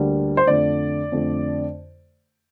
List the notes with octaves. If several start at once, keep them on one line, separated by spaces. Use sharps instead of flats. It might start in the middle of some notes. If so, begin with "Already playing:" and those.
Already playing: D2 D3 G3 A#3
C5
F2 D3 A3 D5
F2 D3 A3